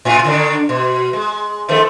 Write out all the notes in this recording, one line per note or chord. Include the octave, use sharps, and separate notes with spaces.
A2 F4
D3 D#3 D4
B2
G#3
D#3 F3 A3